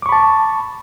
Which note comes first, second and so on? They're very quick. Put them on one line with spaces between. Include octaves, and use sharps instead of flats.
D6 C#6 B5 A5